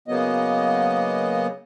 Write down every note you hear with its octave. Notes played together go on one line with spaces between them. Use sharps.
C#3 F#3 A#3 B3 D#5